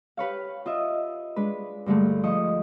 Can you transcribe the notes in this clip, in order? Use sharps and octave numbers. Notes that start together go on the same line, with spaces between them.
G4 B4 C#5 F5
F4 D#5 E5
G#3 D4 B4
G2 D3 G#3 A3
F3 D#5 C#6